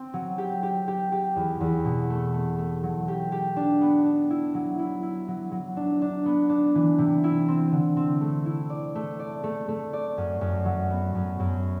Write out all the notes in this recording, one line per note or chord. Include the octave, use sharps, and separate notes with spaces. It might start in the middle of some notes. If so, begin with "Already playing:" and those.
Already playing: C4
F#3
G4
G4
G4
G4
E2
E2
B2
A3
A3
A3
F#3
G4
G4
D4
B3
D4
E4
F#3
E4
E4
F#3
F#3
D4
D4
B3
D4
E3
C3
E4
C4
D3
C4
A3
E4
D5
A3
D5
A3
A3
D5
F#2
F#2
F#3
B3
F#2
F#2